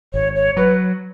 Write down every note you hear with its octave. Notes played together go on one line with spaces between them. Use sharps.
G#1 C#5
C#5
F#3 B4